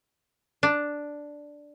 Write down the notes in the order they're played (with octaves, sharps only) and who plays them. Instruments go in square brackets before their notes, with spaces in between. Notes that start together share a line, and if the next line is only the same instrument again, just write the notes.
[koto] D4